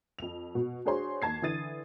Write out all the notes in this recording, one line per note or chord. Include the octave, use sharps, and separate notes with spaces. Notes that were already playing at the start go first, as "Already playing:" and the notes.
F2 F7
B2
D4 F#4 G#4 C5 C#5 C6
D#2 A5 G#6 C7
D3 E3 D#6 A6 D#7